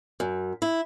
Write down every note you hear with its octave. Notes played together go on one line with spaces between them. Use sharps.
F#2
E4